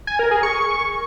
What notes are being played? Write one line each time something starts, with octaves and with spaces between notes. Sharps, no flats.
G#5
A#4
G#4
C#6